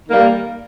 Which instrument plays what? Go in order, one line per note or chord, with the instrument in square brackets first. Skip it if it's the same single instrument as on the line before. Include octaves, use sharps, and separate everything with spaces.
[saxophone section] D#3 G3 A#3